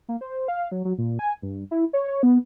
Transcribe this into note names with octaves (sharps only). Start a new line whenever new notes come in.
A#3
C5
F5
F#3
F#3
A#2
G#5
G2
E4
C#5
C#5
B3